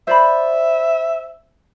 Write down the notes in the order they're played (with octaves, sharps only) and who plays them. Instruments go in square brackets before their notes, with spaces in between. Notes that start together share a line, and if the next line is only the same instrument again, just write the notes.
[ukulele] C5 D5 B5 [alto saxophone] E5